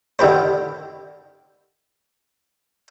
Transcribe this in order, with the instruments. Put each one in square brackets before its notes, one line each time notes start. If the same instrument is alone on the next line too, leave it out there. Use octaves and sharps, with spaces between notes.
[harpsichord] D3 D#3 G4 B4 C5